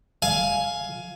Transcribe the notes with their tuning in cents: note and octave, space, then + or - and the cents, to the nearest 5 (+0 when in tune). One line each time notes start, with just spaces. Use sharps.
F5 +5 G#5 +15